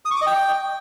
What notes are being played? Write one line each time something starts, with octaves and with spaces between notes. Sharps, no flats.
D#6
C#6
D6
D#5
G5